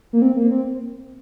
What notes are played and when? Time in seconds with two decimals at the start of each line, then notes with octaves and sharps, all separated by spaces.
0.13 A#3
0.22 C4
0.37 A#3
0.51 C4